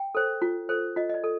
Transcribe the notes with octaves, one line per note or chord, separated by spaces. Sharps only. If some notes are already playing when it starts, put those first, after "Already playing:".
Already playing: G5
A4 C5
F4
A4 C5
F4 D#5
D#5
D5
A4